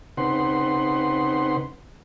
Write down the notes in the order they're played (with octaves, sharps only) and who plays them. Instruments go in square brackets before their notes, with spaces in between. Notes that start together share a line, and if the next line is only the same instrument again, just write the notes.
[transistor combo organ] C#3 C4 D#4 B4 F#5 C6